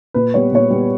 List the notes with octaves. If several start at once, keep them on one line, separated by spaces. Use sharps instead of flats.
A#2 B4
G3 B3 C#5
A#2 C#5
G3 B3